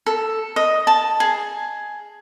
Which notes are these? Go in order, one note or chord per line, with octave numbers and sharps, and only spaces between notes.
A4
D#5
A5
G#4